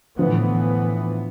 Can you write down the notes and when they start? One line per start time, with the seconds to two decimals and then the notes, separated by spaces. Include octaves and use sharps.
0.18 A2 D3 E3 F3 B3